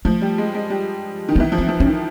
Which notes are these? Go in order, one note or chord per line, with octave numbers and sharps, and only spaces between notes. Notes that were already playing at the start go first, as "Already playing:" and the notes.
F3 A3
G3
G#3
G#3
G3
D#3
B3
E3
F3
C4
F3
C#4
D#3